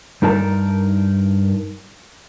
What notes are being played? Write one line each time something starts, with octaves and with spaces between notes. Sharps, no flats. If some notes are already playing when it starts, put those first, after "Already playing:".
G2 D#4 A#4 A5